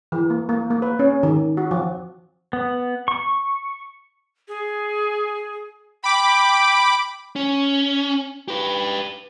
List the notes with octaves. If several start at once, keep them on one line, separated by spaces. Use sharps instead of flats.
E3
A#3
A#3
A#3
B4
C#4
D#3
F#4
F3
B3
C#6
G#4
G5 B5 D6
C#4
G4 B4